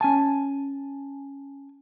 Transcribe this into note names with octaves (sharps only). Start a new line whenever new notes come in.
C#4 G#5 A5